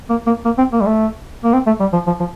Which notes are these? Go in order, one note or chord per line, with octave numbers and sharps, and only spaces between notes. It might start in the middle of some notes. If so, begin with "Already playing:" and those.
A#3
A#3
A#3
C4
A#3
G3
A3
A#3
C4
A3
G3
F3
F3
F3